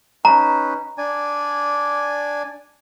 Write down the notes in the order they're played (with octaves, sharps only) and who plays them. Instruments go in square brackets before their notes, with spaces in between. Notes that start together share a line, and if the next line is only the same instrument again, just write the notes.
[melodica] C#4 D#4 B4 [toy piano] A#5
[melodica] D4 D5 G#5